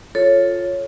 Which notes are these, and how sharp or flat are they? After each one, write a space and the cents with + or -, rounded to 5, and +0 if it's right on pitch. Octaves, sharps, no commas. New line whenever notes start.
F4 +10 A4 +0 C#5 -5